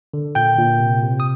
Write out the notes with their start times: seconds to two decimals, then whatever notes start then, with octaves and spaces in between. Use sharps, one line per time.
0.14 D3
0.35 A#2 G5 G6
0.58 A#2
0.80 C3
1.03 C3
1.20 D#6